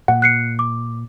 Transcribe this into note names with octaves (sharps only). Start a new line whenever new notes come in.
A#2 F#5
F#6 C7 C#7
D6